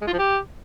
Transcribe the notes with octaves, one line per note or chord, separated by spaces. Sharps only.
G#3
F4
F3
G4